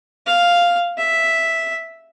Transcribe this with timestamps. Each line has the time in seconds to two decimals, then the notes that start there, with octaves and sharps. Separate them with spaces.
0.26 F5
0.97 E5